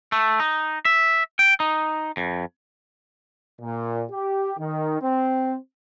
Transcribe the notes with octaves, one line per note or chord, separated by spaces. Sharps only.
A3
D#4
E5
G5
D#4
F2
A#2
G4
D#3
C4